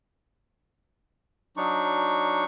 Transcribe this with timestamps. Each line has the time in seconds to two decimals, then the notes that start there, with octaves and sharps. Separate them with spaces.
1.57 F#3 D4 D#4 C#6